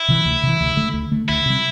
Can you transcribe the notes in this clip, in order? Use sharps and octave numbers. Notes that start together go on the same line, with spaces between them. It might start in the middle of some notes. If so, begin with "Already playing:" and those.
Already playing: E4
C3 E3
D2
C3 E3
D2
D3 A3
D2
D3 A3
D2 E4
C3 G3